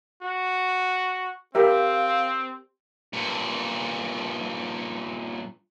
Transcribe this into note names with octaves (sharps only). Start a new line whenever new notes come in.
F#4
C4 G4 A#4 E5 F5
G2 A#2